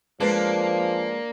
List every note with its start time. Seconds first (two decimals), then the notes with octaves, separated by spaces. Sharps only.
0.20 F3 G#3 A#3 D4 G#4 B4